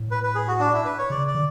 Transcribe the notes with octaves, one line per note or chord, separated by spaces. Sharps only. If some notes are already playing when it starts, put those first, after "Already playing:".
Already playing: A2
B4
B4
G#4
F#4
D4
E4
B4
C#5
C#3 D5
D5
D3